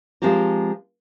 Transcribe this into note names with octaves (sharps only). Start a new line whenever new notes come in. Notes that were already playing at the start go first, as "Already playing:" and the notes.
F3 G#3 C4 G4 A#4